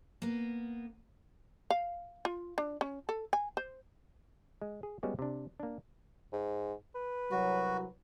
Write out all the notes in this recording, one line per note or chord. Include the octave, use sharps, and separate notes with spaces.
A#3 B3
F5
F4
D4
C#4
A4
G#5
C5
G#3
G#4
G3 G#3 B3 C#4 F#4
C3 D4
A#3 D4
G#2
B4
C2 F#3 F#4